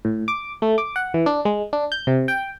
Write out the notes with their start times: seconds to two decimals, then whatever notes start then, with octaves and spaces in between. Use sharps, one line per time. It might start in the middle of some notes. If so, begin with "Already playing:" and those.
0.05 A2
0.28 D6
0.62 A3
0.78 D6
0.96 F#5
1.14 E3
1.26 D4
1.45 G#3
1.73 D4
1.92 G6
2.07 C3
2.28 G5